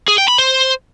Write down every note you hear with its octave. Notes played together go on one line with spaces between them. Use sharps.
G#4
G5
B5
C5